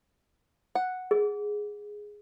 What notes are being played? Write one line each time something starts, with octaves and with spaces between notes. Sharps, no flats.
F#5
G#4